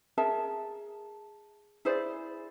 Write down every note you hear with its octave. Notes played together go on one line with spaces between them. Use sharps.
G#4 A#4 E5 A5
E4 G#4 C5 D5